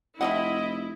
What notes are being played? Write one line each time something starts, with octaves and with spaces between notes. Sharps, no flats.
F1 F3 C4 E4 D#5 F#5